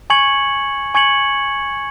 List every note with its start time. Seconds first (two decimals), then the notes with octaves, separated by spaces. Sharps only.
0.10 G#5 C#6 G#6 C#7 F#7
0.95 G#5 C#6 G#6 C#7 F#7